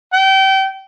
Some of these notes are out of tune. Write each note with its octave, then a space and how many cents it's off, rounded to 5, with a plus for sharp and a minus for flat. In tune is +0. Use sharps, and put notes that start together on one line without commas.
G5 -30